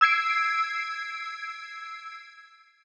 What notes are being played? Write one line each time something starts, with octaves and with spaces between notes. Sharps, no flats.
E6 G#6 C7 D7